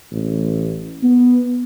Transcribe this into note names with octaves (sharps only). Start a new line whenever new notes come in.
A1
B3